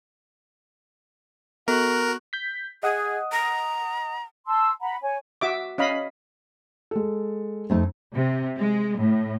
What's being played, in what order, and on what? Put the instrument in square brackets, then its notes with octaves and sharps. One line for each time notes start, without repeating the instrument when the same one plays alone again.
[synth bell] B3 A4 [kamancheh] F#4 F#6 [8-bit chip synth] A#4
[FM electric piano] G6 B6
[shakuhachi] G#4 [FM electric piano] D#5 F#5 D#6
[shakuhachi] A#5
[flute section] A5 C6 E6
F#5 A#5 B5
C#5 G#5
[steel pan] F#4 E5 D6
C#4 D#5 F5 B5
[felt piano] G#3 A4
[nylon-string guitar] F2 A3 D#4
[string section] C3
G#3
A2